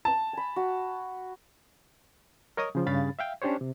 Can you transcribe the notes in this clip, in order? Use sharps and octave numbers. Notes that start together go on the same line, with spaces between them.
A5
G#5 B5
F#4
A#4 C#5 D#5 C#6 D#6
C#3 F3
G2 C#3 F5 B5 A6
E5 F5 G5
C#4 D4 G4 C5 C#5
C3